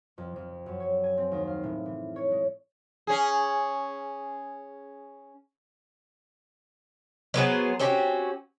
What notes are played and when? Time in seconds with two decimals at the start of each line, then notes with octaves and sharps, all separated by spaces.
0.18 F2
0.36 F2
0.66 F#2
0.80 C#5
1.04 G#5
1.17 C4
1.32 D#2
1.47 F5
1.63 A2
1.86 E3
2.16 C#5
2.31 G#3
3.07 C#4 G#4
7.34 F#3 B3 G#4 C5
7.79 C4 C#4 F#4 G4